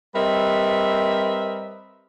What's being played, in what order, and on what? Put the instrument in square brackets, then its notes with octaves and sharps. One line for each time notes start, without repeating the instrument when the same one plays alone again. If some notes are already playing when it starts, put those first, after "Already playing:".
[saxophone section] G3 C4 A#4 B4 D#5 E5